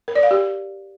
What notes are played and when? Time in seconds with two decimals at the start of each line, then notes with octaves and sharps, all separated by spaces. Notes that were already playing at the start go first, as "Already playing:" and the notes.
0.08 A#4
0.15 D5
0.23 F5
0.31 G4